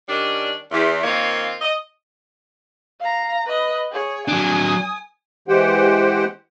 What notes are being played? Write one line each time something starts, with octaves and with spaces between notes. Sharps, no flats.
D#3 G3 C#4 D4
E2
D#3 A#3 C4 F4 C#5
D#5
F5 A#5
B4 D#5
G#4 C#5
F#3 D4 G#5 D#6
E3 G#3 G4 C5 F#5 G5